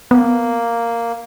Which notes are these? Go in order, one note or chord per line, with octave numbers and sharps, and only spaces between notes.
A#3 B3